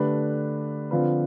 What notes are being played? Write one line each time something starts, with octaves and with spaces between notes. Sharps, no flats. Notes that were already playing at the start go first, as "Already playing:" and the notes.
Already playing: D3 A3 D4 G4 B4
D3 F3 C4 F4 B4